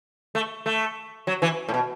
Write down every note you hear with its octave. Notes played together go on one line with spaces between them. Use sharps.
A3
A3
F#3
E3
A2
B2